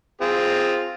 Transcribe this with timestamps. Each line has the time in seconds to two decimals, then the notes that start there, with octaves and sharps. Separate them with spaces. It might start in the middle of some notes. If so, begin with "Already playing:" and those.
0.21 C4 F4 G#4